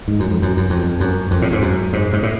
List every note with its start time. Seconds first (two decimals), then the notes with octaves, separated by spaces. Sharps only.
0.08 G#2
0.20 F#2
0.31 F2
0.42 F#2
0.57 F#2
0.70 F2
1.00 F#2
1.31 F2
1.42 A2
1.53 G#2
1.62 F#2
1.93 G#2
2.13 G#2
2.23 A2